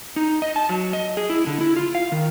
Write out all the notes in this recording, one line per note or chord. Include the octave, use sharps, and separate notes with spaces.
D#4
D#5
A5
F#3
D#5
G#4
E4
D3
E4
F4
F5
D#3